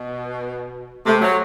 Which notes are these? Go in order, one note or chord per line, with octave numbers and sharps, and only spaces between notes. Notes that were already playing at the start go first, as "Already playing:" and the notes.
Already playing: B2
C3 A3
F#3